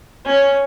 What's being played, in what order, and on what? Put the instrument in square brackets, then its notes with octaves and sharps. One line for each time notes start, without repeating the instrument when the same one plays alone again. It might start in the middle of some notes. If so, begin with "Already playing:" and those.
[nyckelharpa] C#4